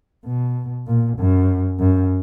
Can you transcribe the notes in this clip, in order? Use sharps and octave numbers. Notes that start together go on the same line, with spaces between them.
B2
A#2
F#2
F#2